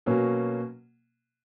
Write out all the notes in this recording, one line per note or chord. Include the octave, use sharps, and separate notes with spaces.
B2 F#3 A#3 C#4